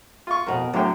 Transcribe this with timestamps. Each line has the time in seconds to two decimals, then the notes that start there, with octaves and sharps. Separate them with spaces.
0.27 F4 C#6
0.47 F2 B2 A#4
0.73 A2 D3 F#3 G5